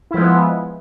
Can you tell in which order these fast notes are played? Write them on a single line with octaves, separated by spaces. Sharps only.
E4 F3 G#3 B3